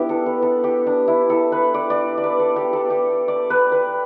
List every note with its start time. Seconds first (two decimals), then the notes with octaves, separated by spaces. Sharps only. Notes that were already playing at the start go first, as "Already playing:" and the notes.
Already playing: B3 D4 E4 G4
0.09 A4
0.26 B4
0.42 A4
0.64 G4
0.86 D4
1.08 E4
1.30 A4
1.52 B4
1.74 D5
1.90 D5
2.18 D5
2.24 B4
2.40 A4
2.56 G4
2.73 A4
2.90 G4
3.28 D5
3.50 B4
3.72 B4